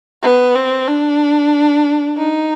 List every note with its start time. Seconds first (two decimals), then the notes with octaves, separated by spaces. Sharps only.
0.23 B3
0.55 C4
0.88 D4
2.17 D#4